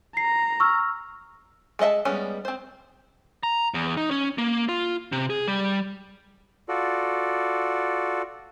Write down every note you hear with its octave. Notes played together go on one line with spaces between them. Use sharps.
A#5 C7
C#6 E6 F6
G#3 A4 D#5 E5 A5
G3 G#3 B3 C#4
C4 C5
A#5
E2
D#4
C#4
A#3
F4
C3
G#4
G3
F4 F#4 A4 D5